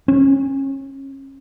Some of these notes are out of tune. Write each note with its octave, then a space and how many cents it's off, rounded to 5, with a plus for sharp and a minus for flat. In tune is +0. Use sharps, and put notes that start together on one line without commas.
C#4 -30